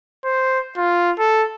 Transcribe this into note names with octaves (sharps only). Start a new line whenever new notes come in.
C5
F4
A4